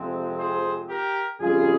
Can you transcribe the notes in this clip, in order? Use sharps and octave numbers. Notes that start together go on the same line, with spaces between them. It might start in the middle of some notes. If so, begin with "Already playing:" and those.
Already playing: F2 C3 F3 G#3 C4
G#4 C5
G4 A#4
F2 C#3 G3 F4 G#4